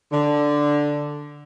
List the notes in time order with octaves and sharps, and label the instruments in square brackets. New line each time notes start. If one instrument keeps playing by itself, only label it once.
[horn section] D3